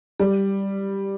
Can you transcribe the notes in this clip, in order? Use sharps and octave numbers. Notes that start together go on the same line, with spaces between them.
G3